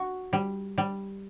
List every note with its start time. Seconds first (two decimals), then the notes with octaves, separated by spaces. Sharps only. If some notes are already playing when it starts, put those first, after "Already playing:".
Already playing: F#4
0.33 G3
0.78 G3